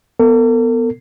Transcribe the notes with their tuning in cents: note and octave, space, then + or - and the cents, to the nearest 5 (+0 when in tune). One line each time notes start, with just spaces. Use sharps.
B3 +0 A4 +45